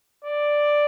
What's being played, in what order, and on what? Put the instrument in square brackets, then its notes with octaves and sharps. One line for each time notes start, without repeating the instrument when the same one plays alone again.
[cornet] D5